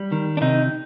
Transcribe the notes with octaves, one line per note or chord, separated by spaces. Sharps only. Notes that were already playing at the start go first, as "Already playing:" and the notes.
Already playing: G3
D#3
D4
C3 D#4